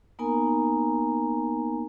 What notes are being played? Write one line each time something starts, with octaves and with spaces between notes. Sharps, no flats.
A#3 B3 D#4 A#4 G#5 A#5